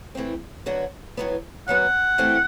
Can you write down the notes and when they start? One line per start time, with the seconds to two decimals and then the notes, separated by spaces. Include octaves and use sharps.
0.15 E3 A3 C4
0.66 D3 F#3 B3 F#4
1.17 A2 F#3 B3
1.68 F#2 F#3 B3 F#4 F#5
2.18 E3 A3 C4 E4 G4